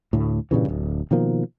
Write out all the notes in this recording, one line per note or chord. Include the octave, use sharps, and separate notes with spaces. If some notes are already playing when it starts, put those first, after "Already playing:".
D2 A2
G2 A#2 C#3 E3
D1 D2
B2 D#3 F3 A#3